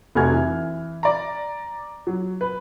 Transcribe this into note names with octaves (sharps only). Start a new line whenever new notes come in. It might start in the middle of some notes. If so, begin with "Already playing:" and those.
F1 A3 F#4 G#5 F6 G#6
E3
D5 A#5
F#3
B4